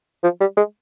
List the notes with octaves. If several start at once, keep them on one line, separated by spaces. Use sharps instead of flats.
F3
G3
G#3